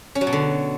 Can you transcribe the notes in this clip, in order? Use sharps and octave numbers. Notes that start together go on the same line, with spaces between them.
C#4
F#3
B2
D3